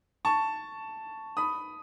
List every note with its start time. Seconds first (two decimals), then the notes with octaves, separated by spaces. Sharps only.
0.25 A5 C#6
1.37 B5 D#6